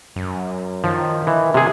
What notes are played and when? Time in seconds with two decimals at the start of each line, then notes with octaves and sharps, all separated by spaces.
0.16 F#2
0.84 D#3 F3
1.27 E3
1.54 C3 G#4